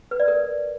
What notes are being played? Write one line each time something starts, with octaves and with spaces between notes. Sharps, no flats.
B4
D5
A#4